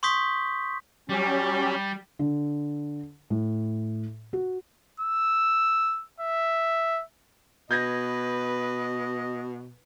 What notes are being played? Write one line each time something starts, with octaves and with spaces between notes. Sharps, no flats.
C6 C#6 D#6 G6 B6
F#3 G3 C#4 G4
D3
A2
F#4
E6
E5
B2 B4 D#5 G6 G#6 A#6